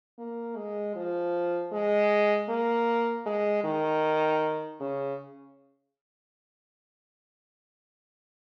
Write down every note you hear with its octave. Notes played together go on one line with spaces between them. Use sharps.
A#3
G#3
F3
G#3
A#3
G#3
D#3
C#3